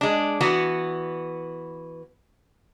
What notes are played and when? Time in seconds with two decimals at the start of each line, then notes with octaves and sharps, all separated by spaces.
0.01 G#3 D4
0.41 E3 B3 F#4